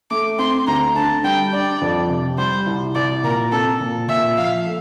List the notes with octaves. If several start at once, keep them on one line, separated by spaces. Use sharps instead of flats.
A3 D6
C4 C6
D2 A#5
D3 A5
G3 G5
D4 D5
F2
C3
G3 C5
C2
C2 D5
A#2 A#4
C4 A4
A#2
A#2 E5
F3 F5
A3